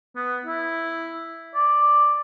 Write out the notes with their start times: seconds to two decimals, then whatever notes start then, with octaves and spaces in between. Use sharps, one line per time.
0.16 B3
0.46 E4
1.54 D5